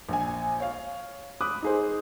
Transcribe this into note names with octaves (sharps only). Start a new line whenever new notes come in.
A#1 G#5
C#5 F5
B5 D6 D#6 F#6
D#4 G#4 C5